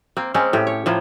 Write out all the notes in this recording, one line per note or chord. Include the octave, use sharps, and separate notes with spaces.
A#3 C4
G#3 A#3 C4 C#4
A2 G4
C#5
A2 F3 A#3